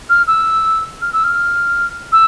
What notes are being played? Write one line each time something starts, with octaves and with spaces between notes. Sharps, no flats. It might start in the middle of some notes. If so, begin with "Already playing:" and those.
F6
E6
F6
E6
F6
E6